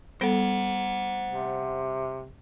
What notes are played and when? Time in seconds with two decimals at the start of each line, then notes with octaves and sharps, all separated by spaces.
0.21 G3 B3 A4 C5 F#5
1.30 C3